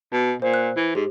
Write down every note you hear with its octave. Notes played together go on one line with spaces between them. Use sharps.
B2
A#2 C5
F#6
E3
G#2 G4